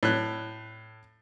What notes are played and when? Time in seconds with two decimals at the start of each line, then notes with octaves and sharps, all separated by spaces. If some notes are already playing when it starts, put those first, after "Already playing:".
0.03 A2 F#6